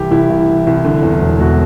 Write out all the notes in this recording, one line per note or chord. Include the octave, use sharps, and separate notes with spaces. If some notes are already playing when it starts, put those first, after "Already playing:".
Already playing: C2 E3 G4
C2 E4
C2
E3
C2
D3
E2
E1
E1 F#4